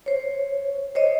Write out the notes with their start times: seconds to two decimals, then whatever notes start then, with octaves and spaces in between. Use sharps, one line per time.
0.06 C5 C#5
0.95 C5 C#5 D#5